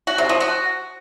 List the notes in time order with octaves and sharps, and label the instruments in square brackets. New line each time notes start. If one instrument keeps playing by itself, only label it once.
[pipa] F#4
C3
F3
F#4